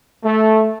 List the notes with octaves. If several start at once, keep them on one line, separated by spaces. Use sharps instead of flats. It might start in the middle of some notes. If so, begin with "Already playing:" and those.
A3